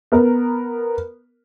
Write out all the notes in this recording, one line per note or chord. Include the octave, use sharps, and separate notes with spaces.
B3 A#4